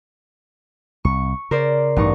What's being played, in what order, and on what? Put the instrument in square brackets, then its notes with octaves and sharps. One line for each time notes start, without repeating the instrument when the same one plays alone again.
[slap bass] C2 [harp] C#6
[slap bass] C#3 [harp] A#4 C5 D5
[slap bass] A1 [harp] G2 D#4 C#6